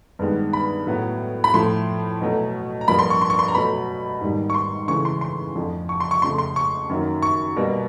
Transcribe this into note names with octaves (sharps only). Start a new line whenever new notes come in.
G2 D#3 G#3 B3
B5
A2 F#3 B3
B5
A2 F3 A3 C6
B2 F#3 A3
A#5
G2 D3 F3 A#3 B5
C6
C#6
C6
C#6
C6
A#5
B2 F#3 A3 B5
G#2 D#3 G3 A#3
C#6
C6
C#3 E3 A3 C#6
C6
C6
F2 D3 F3 A3
C#6
C6
C#6
F2 C#3 F3 A3 C6
C6
C#6
F#2 D#3 F#3 A#3
C#6
B2 G3 A#3